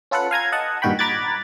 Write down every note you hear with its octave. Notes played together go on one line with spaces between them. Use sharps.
C#4 F4 A4 B4 F#5
F5 G#5 A#5 G#6
D#5 F#5 A5
G2 A#2 D#3 F#4 G5 B5
A#5 B5 D6 F#6 G#6 A6